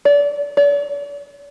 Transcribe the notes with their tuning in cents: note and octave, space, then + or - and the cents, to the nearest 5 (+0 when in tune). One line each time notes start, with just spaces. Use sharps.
D5 -30
D5 -45